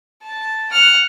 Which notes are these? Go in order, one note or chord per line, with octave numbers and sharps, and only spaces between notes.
A5
F#5 F6